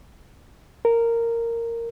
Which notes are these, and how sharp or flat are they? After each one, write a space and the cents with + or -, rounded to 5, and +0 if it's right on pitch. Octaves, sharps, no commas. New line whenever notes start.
A#4 -10